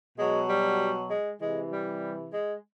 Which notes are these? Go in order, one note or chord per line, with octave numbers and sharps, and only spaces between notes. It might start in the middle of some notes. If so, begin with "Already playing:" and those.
B2 F#3 G#3
G3
G#3
C3 E3 G#3
G3
G#3